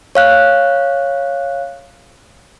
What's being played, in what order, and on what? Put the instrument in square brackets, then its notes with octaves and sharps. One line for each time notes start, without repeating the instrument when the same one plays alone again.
[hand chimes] C#5 F5 F#6